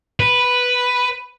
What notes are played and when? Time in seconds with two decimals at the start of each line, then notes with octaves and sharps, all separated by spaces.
0.20 B4